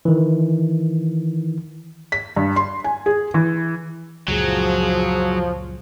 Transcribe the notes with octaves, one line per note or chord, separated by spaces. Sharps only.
D#3 E3
B6
G2
C6
G#5
G#4
E3
C#2 F#2 A#2 F3 F#3 G#4